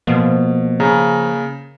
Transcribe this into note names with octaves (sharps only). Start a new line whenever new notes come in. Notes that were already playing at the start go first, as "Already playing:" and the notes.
B2 F3 A#3
C#3 A#5